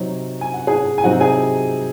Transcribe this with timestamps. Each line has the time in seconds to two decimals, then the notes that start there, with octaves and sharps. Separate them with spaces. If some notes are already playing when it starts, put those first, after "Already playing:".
Already playing: C3 F#3 C4 D#4 C#5
0.41 G#5
0.54 F#5
0.67 G#4 G#5
0.98 G#5
1.04 C3 F#3 C4 D#4 F#4 F#5
1.20 G#4 G#5